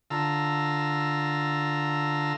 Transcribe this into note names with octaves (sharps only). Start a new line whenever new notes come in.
D3 F4 A5 A#5 E6